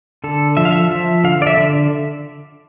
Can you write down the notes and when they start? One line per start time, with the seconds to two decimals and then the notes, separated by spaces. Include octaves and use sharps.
0.24 D3 A4
0.57 F3 E5
0.65 F5
0.72 E5
0.91 F3 E5
1.24 D3 F5
1.42 D5
1.47 E5
1.57 D3